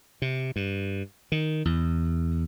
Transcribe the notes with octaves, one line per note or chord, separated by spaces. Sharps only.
C3
G2
D#3
E2